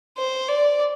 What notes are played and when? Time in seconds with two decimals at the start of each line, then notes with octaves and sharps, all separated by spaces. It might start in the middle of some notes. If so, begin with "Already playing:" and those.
0.18 C5
0.49 D5